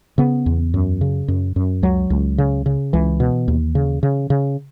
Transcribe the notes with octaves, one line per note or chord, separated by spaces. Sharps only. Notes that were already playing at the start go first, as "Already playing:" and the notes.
C#3 B3
E2
F#2
C#3
F#2
F#2
C#2 F#3
C#2
C#3
C#3
C#2 E3
B2
D#2
C#3
C#3
C#3